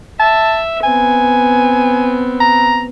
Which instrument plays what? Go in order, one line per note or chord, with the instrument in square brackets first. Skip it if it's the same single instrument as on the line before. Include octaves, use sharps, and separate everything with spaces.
[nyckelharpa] E5 [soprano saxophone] A5
[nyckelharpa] B3 C4 [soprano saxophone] G#5
[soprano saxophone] A#5